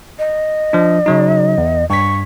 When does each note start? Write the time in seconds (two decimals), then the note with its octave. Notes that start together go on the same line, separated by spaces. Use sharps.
0.19 D#5
0.73 F3 D4
1.06 C#3 F#3 D#4
1.58 E2
1.90 G2 C#6 B6